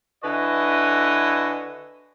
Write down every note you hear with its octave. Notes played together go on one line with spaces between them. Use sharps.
D3 E4 F#4 B4 D#5 G#5